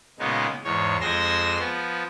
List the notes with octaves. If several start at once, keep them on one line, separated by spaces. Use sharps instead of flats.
A#2 C#3 G#3 B3 D#4
E2 G#2 C#5
F2 G#3 G#5 C6 E6 A#6
F3 B3